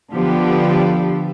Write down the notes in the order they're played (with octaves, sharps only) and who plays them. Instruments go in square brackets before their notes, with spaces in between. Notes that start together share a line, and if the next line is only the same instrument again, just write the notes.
[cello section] D3 F3 B3 G4 D5